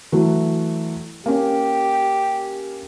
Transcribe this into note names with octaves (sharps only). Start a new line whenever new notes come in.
E3 F#3 A3
A#3 C#4 G4